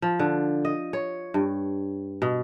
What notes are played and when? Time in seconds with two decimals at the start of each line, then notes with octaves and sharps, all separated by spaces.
0.02 F3
0.19 D3
0.65 D#5
0.93 C#5
1.34 G2
2.22 B2